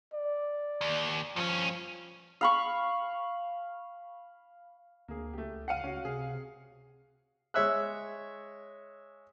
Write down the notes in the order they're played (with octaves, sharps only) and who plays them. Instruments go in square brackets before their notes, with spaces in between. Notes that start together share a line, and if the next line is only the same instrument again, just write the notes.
[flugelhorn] D5
[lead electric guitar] D#2
[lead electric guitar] G2 C#4 [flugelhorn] F3
[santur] F5 B5 C#6
[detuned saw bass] D2 [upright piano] A#3 G#4
[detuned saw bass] C#2 [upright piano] A3 G4
[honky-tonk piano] F5 F#5 [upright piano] C7 C#7 D#7
[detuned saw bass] C#2 [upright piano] C#4 F#4
[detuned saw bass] C3 [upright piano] G#4
[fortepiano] G#3 C#5 E5 E6 F#6